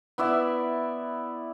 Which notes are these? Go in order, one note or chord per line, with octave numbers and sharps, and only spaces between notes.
B3 E4 D5 E5